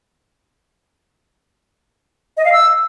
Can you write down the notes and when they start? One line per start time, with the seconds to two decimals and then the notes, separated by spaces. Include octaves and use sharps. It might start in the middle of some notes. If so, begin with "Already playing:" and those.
2.37 D#5
2.45 F5
2.52 E6